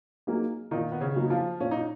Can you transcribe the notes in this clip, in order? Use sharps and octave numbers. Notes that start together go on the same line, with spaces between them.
F#3 A#3 D#4 G#4
A#2 D#3 D#4
B3
C#3 C#4
F#3 A#3 D#4 G#4
F3 F4
A#2 C#4
D#4